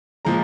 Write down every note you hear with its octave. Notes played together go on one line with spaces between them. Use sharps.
A#2 F3 G#3 A#5